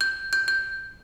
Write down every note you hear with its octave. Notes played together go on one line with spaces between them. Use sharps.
G6
G6
G6